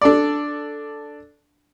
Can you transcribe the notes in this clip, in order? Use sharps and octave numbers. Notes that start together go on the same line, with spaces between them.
D4 A4 D5